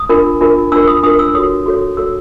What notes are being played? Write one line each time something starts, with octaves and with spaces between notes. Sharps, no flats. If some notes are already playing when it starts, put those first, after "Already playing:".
Already playing: D#6
D4 F4 A#4
D4 F4 A#4
D4 F4 A#4 E6
D#6
D4 F4 A#4 D#6
E6
F#4 A4 C#5 D#6
F#4 A4 C#5
F#4 A4 C#5 E6